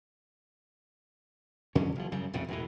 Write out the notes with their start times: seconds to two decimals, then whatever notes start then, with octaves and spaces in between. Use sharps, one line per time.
1.75 F2 D3 F#3 C#4
1.95 F#1 F3
2.12 F#2 C#3 G3
2.33 A#1 F2 A2 C#3
2.48 E1 A2 E3